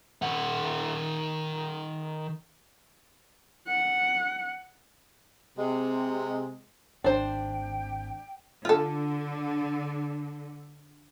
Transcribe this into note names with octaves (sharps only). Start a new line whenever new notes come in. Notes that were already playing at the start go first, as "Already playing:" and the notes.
D#3 F#5
F#5
C3 G#3
G#1 D4 C5 G5
D3 F4 A4